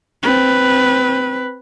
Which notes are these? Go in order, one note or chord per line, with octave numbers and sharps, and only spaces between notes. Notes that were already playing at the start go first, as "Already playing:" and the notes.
C4 B4